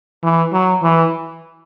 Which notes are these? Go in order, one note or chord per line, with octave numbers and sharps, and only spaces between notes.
E3
F#3
E3